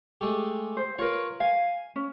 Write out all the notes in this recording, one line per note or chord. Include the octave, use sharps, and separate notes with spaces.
G#3 A3 G4
C5
F4 A#4 B4 C#5
F5 G#5
C#4